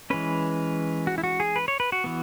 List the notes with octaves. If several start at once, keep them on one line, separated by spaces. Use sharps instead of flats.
E3 G#3 C#4 B4
F#4
E4
F#4
G#4
B4
C#5
B4
F#4
E3 B3